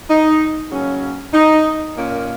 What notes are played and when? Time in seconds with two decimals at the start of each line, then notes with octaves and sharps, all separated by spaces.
0.10 D#4
0.71 C#3 F#3 A#3 C#4
1.34 D#4
1.96 A#2 A#3 C#4